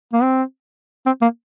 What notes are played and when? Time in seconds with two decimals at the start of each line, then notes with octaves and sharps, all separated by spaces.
0.13 A#3
0.23 C4
1.06 C4
1.22 A#3